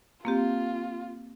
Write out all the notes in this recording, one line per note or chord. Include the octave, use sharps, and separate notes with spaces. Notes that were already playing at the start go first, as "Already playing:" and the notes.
A#3 C4 F4 G4